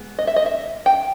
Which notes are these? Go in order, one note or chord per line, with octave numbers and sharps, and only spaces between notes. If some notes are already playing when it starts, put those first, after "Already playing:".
Already playing: G#3 B3
D#5
E5
D#5
E5
G5